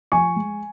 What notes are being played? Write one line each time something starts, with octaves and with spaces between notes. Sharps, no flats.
F3 G#5 C#6
G#3